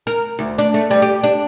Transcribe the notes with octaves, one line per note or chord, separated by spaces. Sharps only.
A#4
D2
D4
A3
G3
G4
D4